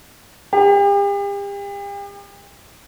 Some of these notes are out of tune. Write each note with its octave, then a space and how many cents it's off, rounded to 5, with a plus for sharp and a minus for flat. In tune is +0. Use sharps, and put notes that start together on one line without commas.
G4 +40